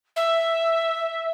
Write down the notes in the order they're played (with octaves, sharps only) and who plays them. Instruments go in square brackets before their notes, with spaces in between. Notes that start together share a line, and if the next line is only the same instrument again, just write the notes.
[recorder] E5